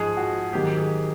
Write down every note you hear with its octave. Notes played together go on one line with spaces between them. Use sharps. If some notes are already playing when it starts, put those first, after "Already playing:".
Already playing: G#2 F3 G#4
F#4
G#2 D#3 F#3 G4
G#4